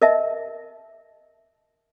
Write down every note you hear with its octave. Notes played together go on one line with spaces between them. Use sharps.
A#4 D#5 E5 A5